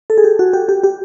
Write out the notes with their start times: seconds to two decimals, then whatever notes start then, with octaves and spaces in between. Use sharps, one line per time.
0.10 A4
0.18 G#4
0.24 G4
0.39 F#4
0.53 G4
0.69 G4
0.84 G4